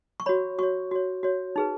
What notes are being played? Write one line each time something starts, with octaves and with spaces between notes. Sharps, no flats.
C#6
F#4 C#5 B5
F#4 C#5 C#6
F#4 C#5
F#4 C#5
D#4 G#4 B4